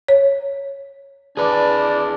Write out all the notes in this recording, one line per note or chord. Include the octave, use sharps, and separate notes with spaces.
C#5
E3 D4 G#4 B4 D5